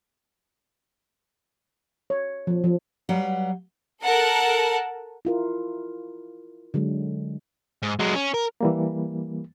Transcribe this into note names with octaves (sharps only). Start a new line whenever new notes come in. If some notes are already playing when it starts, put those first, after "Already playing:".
C#5
F3
F3
F#3 G3 B4 F5 F#5
A4 A#4 F#5 A5
E4 F4 A#4
D3 F#3 G#3
G#2
F#3 G#3
C#4
A#4
E3 G3 A#3